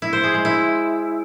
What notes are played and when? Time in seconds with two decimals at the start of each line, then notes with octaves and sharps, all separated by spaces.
0.02 E4
0.13 C5
0.23 G#4
0.34 G#3
0.45 E4